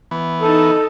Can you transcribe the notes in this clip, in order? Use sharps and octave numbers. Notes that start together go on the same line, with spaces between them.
E3 B3
D#4 A4 A5